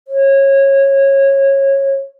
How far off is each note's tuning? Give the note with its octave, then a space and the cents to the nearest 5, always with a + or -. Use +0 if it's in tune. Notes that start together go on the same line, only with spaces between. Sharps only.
C#5 -20